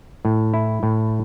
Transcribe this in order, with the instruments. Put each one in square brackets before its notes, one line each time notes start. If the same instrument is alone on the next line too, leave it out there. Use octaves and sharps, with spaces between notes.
[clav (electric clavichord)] A2
E4
A2